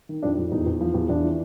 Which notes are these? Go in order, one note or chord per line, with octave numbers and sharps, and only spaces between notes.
D#3
F2 D4
F2
E2 D#4
E2
F3
E2
E2 D4
E3